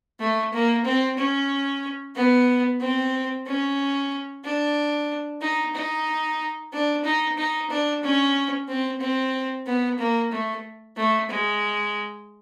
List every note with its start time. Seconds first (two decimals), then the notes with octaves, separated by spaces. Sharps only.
0.20 A3
0.53 A#3
0.85 C4
1.18 C#4
2.16 B3
2.80 C4
3.46 C#4
4.45 D4
5.42 D#4
5.75 D#4
6.73 D4
7.05 D#4
7.38 D#4
7.70 D4
8.03 C#4
8.68 C4
9.01 C4
9.66 B3
9.99 A#3
10.31 A3
10.97 A3
11.30 G#3